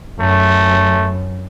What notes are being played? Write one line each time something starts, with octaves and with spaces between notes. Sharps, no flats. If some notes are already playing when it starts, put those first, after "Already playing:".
F#2 A3